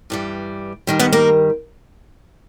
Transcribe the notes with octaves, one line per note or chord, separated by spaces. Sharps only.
G2 E3 G3
G2 D#3 G3
B3 B4
A#3 A#4